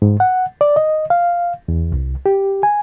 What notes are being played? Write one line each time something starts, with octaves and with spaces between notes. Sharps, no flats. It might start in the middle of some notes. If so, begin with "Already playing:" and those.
G#2
F#5
D5
D#5
F5
E2
C2
G4
G#5